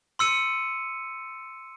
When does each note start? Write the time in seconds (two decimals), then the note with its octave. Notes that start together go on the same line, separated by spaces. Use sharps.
0.19 C6 E6 C#7 D#7